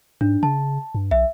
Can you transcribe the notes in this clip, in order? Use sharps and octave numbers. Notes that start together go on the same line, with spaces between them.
G#2 D4
C#3 A5
G2
B1 E5